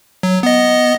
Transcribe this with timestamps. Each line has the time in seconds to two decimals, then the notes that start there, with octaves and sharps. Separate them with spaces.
0.23 F#3
0.43 B3 D#5